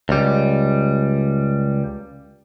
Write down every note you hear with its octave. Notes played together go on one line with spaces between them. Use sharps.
C#2 G3